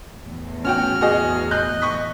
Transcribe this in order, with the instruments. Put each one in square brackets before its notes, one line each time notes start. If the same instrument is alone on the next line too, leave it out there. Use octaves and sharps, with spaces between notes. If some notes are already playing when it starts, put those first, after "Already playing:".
[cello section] E2 A2
[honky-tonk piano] C#4 F#4 G5 [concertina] F6
[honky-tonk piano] F#4 G#4 D#5
[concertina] D#5 [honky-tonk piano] F#6 G6
[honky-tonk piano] C#6 D#6 B6